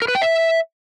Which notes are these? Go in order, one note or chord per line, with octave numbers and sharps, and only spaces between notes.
A#4
B4
G5
E5